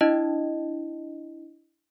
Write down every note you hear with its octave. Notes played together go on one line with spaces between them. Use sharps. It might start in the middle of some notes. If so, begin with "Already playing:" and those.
D4 E4 D#5